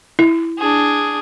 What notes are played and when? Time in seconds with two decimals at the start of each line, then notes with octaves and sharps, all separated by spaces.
0.19 E4
0.59 D4 G#4